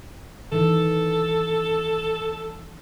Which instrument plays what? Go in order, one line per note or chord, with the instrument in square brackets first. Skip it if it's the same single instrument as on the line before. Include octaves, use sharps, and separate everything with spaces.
[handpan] D#3 E3 [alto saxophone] A4